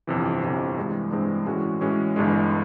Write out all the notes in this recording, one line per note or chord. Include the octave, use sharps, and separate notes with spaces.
G1 F2 C3 E3
G1 F2 C3 E3
G2 E3 G#3 C4
G2 E3 G#3 C4
A2 E3 G#3 C#4 F#4
A2 E3 G#3 C#4 F#4
G1 G2 E3 G#3